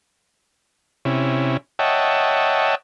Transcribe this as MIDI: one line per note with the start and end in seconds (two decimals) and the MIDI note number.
1.05 1.57 48
1.05 1.57 61
1.05 1.57 64
1.79 2.75 73
1.79 2.75 75
1.79 2.75 76
1.79 2.75 78
1.79 2.75 79
1.79 2.75 81